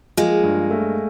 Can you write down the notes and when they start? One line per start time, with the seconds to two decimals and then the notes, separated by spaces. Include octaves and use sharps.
0.17 F3 G#3 A#3
0.43 G2
0.71 A3